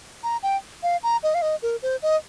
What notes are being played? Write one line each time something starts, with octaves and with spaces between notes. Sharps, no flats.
A#5
G5
F5
A#5
D#5
F5
D#5
A#4
C5
D#5